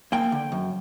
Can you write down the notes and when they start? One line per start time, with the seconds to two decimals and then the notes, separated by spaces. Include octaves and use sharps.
0.12 A#3 G5
0.32 D3
0.52 F#2